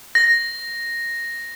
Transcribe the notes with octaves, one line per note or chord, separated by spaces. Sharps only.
A#6